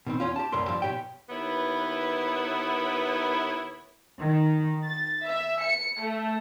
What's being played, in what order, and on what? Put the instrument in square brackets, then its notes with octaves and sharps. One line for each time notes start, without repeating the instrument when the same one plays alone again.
[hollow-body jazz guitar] B2 D#3 C4
E2 C#4 F4
G4 A5
C2 F#2 A3 A#4 C6
G2 F3
B2 G4 C#5 G5
[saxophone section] D#2 B3 E4 B4 C#5
[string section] D#3
A6
E5
C#7
A3